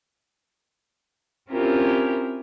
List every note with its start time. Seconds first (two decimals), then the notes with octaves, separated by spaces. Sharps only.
1.50 C4 C#4 E4 F4 G4 A#4